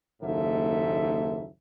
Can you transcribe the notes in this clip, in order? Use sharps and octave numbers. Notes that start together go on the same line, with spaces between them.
F#1 D#2 G#2 A4 E5